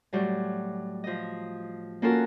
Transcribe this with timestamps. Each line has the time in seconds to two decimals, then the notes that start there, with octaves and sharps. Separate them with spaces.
0.13 A2 F#3 G3
1.04 F3 D#5
2.02 A#3 C#4 F4 F#4 A4 A#4